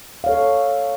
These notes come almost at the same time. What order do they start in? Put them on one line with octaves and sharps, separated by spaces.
F5 C#5 A4